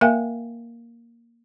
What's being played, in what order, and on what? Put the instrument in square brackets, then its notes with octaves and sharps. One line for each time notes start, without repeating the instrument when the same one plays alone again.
[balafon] A#3 A#4 E5 F5 G5 G#5